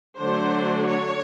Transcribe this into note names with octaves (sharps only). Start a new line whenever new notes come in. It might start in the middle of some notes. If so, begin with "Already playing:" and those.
D3 F#3 A3 D4 C5
C#5